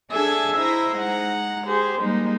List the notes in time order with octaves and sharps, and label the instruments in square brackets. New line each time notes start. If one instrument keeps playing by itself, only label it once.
[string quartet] D4 G#4 A4 E5 G#5 A5
E4 C5 D#5 E5 A#5
G#3 D#4 F#5 A#5
G4 G#4 C5
G3 G#3 A#3 D#4